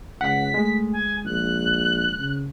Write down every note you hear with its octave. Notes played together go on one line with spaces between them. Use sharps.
C#2 F#5 B6
G#3 A3
G#5
A#1 F#6
C#3